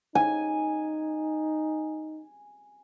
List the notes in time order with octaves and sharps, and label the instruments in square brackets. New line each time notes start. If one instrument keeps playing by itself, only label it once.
[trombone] D#4 [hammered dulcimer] G#5